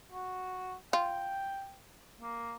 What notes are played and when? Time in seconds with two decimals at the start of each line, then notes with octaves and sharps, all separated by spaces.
0.12 F#4
0.93 F4 G5
2.21 A#3